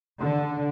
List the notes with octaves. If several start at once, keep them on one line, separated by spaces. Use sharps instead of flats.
D3